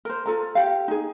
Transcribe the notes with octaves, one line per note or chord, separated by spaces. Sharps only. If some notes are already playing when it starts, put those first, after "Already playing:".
A#4 C5
F4 A4 A#5
G4 F5
D#4 G#4